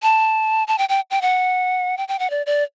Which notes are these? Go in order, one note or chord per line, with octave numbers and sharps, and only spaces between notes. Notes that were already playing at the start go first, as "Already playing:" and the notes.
A5
A5
G5
G5
G5
F#5
G5
G5
F#5
D5
D5